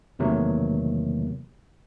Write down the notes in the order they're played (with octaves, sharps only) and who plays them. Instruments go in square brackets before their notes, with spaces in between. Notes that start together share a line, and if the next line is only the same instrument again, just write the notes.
[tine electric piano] E2 C3 D#3 F#3 A3 A#3